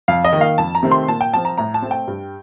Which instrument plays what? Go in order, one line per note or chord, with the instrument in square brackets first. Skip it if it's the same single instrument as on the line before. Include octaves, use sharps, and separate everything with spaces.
[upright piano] F2 F5
D#5
D#3
A#3 F5
F2 A5
A#5
C3 D#3 A3 C4
C6
A#2 A5
G5
F3 C4 A5
A#5
A2 A#5
A5
A3 C4
G5
G2